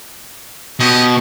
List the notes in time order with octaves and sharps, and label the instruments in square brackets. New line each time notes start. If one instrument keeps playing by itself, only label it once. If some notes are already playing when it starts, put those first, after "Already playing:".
[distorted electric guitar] B2 [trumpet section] C#4 G4 D#5